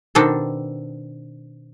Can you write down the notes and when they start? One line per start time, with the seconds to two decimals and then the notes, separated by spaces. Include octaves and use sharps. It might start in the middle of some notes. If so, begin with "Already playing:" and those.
0.15 B2 D#3 C4 D4 A4